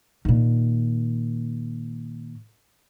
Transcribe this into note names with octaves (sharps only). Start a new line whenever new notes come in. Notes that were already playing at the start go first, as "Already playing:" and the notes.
A#2 D#3